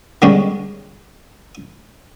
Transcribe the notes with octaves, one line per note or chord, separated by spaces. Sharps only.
D3 G3 G#3 C#4